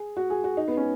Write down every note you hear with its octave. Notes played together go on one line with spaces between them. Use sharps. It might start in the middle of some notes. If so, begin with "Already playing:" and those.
Already playing: G#4
F#4
G#4
F#4
D#4
B3
C#4